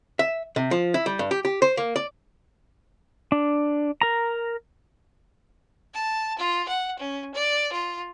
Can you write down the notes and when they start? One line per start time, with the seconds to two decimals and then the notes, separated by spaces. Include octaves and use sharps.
0.19 E5
0.56 C3
0.71 F3
0.94 E4
1.06 G3
1.19 G2
1.31 G4
1.45 G4
1.62 C5
1.77 A#3
1.96 D5
3.32 D4
4.02 A#4 A#5
5.94 A5
6.39 F4
6.68 F#5
6.99 C#4
7.35 D5
7.72 F4